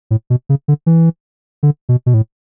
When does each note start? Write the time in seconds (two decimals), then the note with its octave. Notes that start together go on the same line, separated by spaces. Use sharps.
0.11 A2
0.30 B2
0.49 C#3
0.68 D3
0.86 E3
1.63 D3
1.89 B2
2.06 B2
2.14 A2